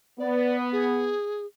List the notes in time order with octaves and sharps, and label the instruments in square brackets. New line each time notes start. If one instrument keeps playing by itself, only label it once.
[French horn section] B3 [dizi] D5
[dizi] G#4